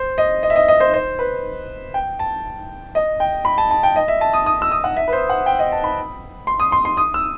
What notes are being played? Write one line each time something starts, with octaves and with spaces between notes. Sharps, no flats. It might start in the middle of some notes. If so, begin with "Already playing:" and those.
Already playing: C5
D#5
D#5
E5
D#5
D#5
C5
C5
B4
G5
A5
D#5
G5
B5
A5
A5
G5
D#5
E5
A5
D#6
D#6
E6
D#6
F#5
E5
B4
C5
F#5
G5
D#5
A5
B5
C6
D#6
C6
C6
D#6
E6